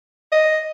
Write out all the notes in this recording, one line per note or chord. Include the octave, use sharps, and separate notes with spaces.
D#5